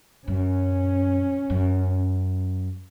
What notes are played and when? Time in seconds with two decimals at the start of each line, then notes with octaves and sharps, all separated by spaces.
0.28 F#2 C#4
1.50 F#2